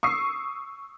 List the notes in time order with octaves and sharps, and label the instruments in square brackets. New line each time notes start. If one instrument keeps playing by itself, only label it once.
[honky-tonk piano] C#6 D#6 E6 C7